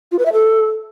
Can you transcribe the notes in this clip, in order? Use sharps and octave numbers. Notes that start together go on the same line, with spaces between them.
F4
B4
E5
A4